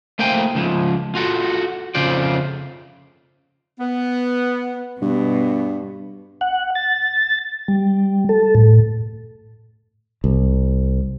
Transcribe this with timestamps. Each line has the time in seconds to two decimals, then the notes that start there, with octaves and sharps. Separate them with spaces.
0.19 A3 A#3 C5 G5 G#5
0.55 C#2 F3
1.15 F4 F#4 A4
1.95 F2 C#3 F4 C5 D5
3.80 B3
5.02 G2 B2
6.41 F#5
6.75 A6
7.68 G3
8.29 A4
8.55 A2
10.24 C2